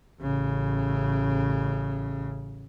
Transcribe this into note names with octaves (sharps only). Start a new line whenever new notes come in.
A1 C#3